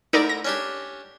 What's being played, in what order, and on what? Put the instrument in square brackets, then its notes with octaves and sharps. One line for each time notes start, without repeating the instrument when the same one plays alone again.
[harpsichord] D2 E4 A#5 [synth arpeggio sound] D#4 A#4 D5
[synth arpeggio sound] A#6
[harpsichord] C#4 D4 G4